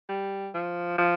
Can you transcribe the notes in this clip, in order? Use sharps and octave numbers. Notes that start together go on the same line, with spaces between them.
G3
F3
F3